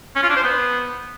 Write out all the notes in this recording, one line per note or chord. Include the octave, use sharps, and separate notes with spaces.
C#4
F4
D4
C5
B3